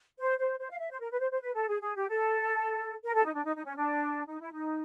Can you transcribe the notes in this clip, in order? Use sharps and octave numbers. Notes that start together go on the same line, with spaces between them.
C5
C5
C5
F5
E5
C5
A#4
B4
C5
C5
B4
A4
G#4
G#4
G4
A4
A#4
A4
D#4
D4
D#4
D#4
C#4
D4
D#4
E4
D#4